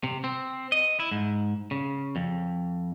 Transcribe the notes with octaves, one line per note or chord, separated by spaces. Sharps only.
C3
C4
D#5
E4
G#2
C#3
F2